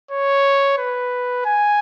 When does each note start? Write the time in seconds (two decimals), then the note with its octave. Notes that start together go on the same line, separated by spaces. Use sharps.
0.11 C#5
0.78 B4
1.45 G#5